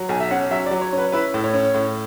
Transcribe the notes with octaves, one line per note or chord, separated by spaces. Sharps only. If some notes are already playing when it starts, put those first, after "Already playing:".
Already playing: F#3
B1 G#5
E5
C#4 F#5
F#3 E5
D5
F#3
C#5
C#4
B4
E4 B4
A2
C#5
C#4
A2